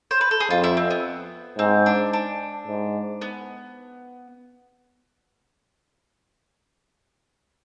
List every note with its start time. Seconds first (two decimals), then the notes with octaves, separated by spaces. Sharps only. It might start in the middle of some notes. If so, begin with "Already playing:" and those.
0.11 C5
0.21 B4
0.31 A4
0.40 G#4
0.50 F2 F4
0.64 E4
0.77 C4
0.91 B3
1.58 G#2 C4
1.86 D4
2.13 D4
2.68 G#2
3.22 B3